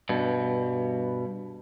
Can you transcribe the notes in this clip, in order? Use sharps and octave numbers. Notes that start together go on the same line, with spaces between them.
G2 B2